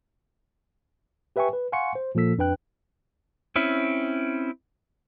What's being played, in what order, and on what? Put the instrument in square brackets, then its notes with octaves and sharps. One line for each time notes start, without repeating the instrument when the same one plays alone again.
[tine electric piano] G4 B4 E5 G5 G#5 C#6
B4
F5 F#5 G#5 C6 C#6 C#7
C5
A#2 F3 A#3 A4 E6 B6
F2 D4 B4 G5 F#6
[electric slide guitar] C4 C#4 E4